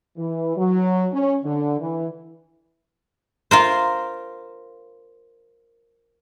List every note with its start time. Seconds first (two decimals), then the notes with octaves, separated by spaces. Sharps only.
0.17 E3
0.57 F#3
1.12 C#4
1.44 D3
1.79 E3
3.51 F4 A#4 C5